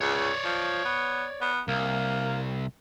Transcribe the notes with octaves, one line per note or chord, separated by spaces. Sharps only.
C#2 C#5 D5
F3
B3
B3
C2 A#3